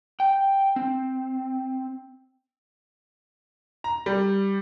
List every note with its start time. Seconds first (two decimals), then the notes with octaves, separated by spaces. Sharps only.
0.20 G5
0.76 C4
3.84 A#5
4.06 G3